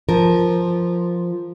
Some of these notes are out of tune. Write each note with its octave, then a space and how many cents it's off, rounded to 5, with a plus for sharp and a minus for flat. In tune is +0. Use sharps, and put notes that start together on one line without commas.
F3 +0 A#4 +0